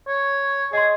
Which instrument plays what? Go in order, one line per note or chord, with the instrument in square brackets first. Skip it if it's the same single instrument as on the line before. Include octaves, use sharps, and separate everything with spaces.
[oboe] C#5
[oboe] G#4 [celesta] D#5 C6